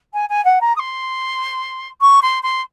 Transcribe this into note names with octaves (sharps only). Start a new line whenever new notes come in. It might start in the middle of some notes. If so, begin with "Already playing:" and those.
G#5
G#5
F#5
A#5
D#6
C6
C#6
C6
C6